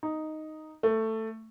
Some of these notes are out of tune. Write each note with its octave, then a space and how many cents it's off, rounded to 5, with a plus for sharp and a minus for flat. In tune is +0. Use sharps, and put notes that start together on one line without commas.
D#4 +0
A3 +10